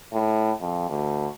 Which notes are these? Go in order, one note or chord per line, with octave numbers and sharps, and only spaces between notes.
A2
F2
D2